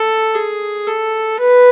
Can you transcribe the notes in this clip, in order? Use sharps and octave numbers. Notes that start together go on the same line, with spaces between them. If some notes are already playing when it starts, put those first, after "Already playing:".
Already playing: A4
G#4
A4
B4